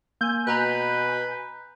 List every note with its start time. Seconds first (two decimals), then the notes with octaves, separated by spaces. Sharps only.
0.21 A#3 G#5 G6
0.47 B2 B4 A#5 B5 F#6